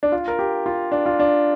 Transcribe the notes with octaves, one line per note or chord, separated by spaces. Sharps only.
D4
F4
A#4
G4
F4
D4
F4
D4